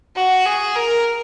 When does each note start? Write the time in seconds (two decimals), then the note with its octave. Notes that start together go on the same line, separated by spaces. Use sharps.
0.16 F#4
0.45 G#4
0.75 A#4